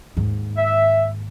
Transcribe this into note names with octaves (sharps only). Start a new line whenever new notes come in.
D#2 G#2
E5